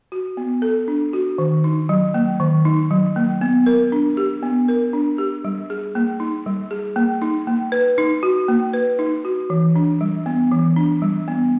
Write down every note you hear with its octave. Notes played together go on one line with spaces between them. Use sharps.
F#4
B3
A4
D4
F#4
D#3
D#4
F#3
A#3
D#3
D#4
F#3
A#3
B3
A#4
D4
G4
B3
A#4
D4
G4
G3
G#4
A#3
D#4
G3
G#4
A#3
D#4
A#3
B4
D#4
F#4
A#3
B4
D#4
F#4
E3
D4
G3
B3
E3
D4
G3
B3